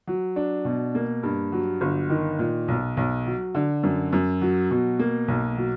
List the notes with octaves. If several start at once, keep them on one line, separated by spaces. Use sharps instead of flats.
F#3
D4
B2
A#3
G2
F#3
G1
D#3
A#2
B1
B1
F#3
D3
F#2
F#2
F#3
B2
A#3
B1
F#3